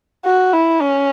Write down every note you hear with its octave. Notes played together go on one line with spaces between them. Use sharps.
F#4
E4
C#4